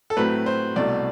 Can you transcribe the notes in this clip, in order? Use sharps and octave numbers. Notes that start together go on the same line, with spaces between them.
A4
A2 F#3 A3 C4 B4
C5
C2 B2 A3 D5